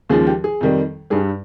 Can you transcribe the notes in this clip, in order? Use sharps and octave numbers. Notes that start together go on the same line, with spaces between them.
D#2 C#3 F3 G#3 G#4
G4
G#4
F2 D#3 G3
G2 G3 G#4